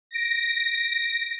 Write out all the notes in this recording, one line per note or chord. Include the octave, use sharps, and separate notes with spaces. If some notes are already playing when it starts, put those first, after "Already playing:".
A#6 D7